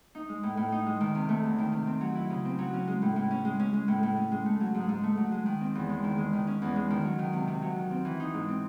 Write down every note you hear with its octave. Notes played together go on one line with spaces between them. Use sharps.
D#4
G#3
A2
A2
D#4
G#3
D#3
C3
A3
E2
D#3
C3
C4
F#3
E4
C#3
C4
F#3
C#4
G#3
A2
A2
C#4
G#3
C#4
G#3
A2
A2
C#4
G#3
A3
F#3
G#2
G#2
A3
F#3
G#3
D#3
C4
E2
G#3
D#3
G#3
D#3
C#4
E2
G#3
D#3
F#3
D#3
C3
C3
F#3
D#3
C4
E3
D#4
G#2
C4